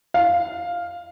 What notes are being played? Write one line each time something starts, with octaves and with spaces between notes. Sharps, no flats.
F5